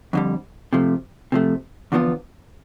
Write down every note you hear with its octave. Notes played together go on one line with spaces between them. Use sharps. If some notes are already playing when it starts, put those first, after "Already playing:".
F2 D3 G3
C3 F3 A3
C3 F3 A3
E2 D3 F3 B3 F4